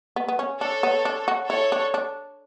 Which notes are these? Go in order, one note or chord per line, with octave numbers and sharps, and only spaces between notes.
B3
B3
C#4
D4 A4 C#5
B3
D4
F#4
E4 A4 C#5
D4
D4